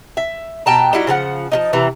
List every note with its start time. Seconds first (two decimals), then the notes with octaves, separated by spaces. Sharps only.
0.17 E5
0.66 B2 G5 A5 A#5
0.93 G3 D#4 E4 F#4
1.07 C#3 F3 A4 F#5
1.52 F3 C#4 D#4
1.73 C3 E3 B3 A#5